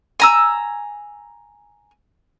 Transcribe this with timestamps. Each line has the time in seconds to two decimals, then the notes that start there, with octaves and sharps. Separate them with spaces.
0.20 G#5 A#5 E6